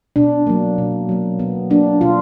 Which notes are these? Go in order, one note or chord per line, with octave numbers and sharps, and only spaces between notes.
B2 D4
F#3 A#3
B2
F#3 A#3
B2 B3
F#3 A#3 D4
B2 F4